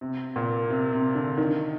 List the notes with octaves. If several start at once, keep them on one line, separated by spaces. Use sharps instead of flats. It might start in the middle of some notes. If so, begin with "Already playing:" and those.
C3
A#2
C3
C3
D3
D#3